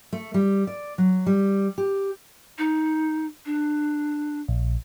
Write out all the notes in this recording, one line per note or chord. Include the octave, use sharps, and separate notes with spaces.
A3
G3
D5
F#3
G3
G4
D#4
D4
A#1